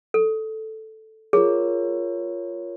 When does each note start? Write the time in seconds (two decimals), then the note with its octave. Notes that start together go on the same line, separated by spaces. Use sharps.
0.14 A4
1.33 F4 G#4 A#4 C#5